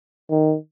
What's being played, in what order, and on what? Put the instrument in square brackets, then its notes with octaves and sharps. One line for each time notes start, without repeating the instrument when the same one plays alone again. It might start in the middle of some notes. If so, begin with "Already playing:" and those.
[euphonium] D#3